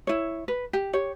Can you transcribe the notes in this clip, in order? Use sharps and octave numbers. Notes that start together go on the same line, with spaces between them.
E4 C#5
B4
G4
G4 C#5